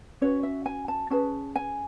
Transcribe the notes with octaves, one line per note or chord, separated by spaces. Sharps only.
C#4 F#4 B4 C#5
E5
G#5
A5
C#4 G#4 B4 A5
G#5